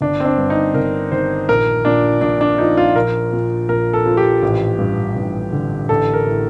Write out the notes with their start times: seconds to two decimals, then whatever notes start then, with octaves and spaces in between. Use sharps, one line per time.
0.01 G1 D4
0.20 C4
0.25 D4
0.38 G2
0.50 D#4
0.74 G1 A#4
1.12 D#3 C5
1.48 A#1 A#4
1.85 A#2 D4
2.21 A#1 D4
2.41 D4
2.58 F3 D#4
2.77 F4
2.95 A#1 A#4
3.32 A#2
3.69 A#1 A#4
3.93 A4
4.06 F3
4.17 G4
4.42 A1
4.79 G2
5.16 A1
5.52 D3
5.89 A1 A4
6.14 A#4
6.26 A2